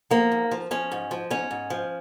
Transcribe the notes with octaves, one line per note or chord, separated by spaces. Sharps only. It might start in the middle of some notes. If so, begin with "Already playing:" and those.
F3 A#3
G#2
F3
F3 C#4
G#2
F3
G#2 C#4
G#2
F3